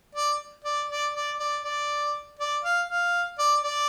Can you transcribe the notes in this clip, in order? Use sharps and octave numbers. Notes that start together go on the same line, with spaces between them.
D5
D5
D5
D5
D5
D5
D5
F5
F5
D5
D5